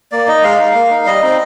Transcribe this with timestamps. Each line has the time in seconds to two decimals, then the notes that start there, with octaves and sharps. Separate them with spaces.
0.12 A#3 D5
0.28 D#4 D#5
0.43 G#3 F5
0.59 D#4
0.75 A#3
0.90 D#4
1.06 G3 D#5
1.22 C4 D#4